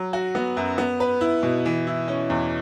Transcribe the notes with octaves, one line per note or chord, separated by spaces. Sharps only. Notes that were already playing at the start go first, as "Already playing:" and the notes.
Already playing: F#3
F#4
B3
F#2
B3
B4
E4
B2
E3
E4
C#4
E2